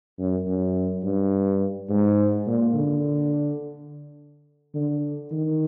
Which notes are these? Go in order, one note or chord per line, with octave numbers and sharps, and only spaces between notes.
F#2
F#2
G2
G#2
A#2
D3
D3
D#3